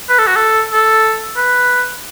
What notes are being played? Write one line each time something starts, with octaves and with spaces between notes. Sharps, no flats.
B4
A4
F#4
A4
A4
B4